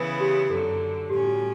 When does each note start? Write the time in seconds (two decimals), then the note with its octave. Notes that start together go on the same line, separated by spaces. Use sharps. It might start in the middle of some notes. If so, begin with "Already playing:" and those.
Already playing: C#3 E3 B3 E4 B4
0.20 G4
0.50 F#2 D3 F#3 A4
1.10 A2 G3 C#4 G4
1.25 F#4